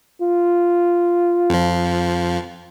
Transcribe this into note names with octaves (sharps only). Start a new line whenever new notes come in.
F4
F2 F3